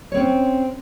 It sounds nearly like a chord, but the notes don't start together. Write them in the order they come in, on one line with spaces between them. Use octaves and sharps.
C#5 C4 C#4